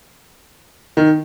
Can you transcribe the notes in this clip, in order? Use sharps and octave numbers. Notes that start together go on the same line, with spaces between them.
D#3